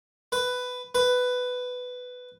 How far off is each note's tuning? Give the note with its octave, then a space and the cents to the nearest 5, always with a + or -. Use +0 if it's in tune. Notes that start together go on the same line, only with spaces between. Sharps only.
B4 +10
B4 +10